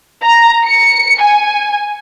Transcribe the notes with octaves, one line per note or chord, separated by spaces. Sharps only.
A#5
C#7
G#5